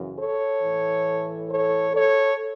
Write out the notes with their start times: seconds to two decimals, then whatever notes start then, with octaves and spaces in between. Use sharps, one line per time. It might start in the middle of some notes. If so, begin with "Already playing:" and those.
Already playing: F#2 C#3 E3
0.18 A4 C#5
0.62 A2 E3
1.50 A4 C#5
1.94 A4 C#5